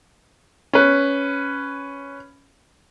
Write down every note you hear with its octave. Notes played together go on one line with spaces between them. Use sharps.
C#4 B4